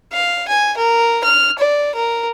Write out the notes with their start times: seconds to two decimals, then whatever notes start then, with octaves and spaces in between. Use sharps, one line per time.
0.13 F5
0.48 G#5
0.77 A#4
1.24 F6
1.58 D5
1.95 A#4